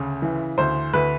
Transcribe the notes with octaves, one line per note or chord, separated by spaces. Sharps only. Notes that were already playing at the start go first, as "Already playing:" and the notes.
Already playing: D2 C#3
E3
D2 C5
D2 B4